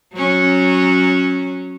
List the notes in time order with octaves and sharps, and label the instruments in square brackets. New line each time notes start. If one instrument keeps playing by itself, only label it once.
[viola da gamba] F#3 C#4